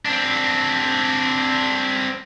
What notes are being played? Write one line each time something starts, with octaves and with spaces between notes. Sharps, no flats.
C4 D4